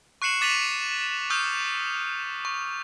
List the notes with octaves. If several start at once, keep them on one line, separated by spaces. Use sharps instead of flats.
C#6 F#6 C7 C#7 E7 F#7
D6 A6 B6 D#7 F7 F#7
C#6 D#6 F6 G6
C#6